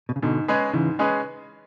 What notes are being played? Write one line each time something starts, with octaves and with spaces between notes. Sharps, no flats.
B2
C#3
G#2 B2 D3
G#3 C#4 G#4 B4
G#2 C#3 E3
G#3 C#4 G#4 B4